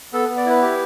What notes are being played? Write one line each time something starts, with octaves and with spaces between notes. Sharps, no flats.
B3 A4
B3
D5
E4 B4
G4